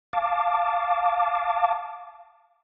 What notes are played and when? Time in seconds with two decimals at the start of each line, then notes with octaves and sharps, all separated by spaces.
0.13 F5 A5 D6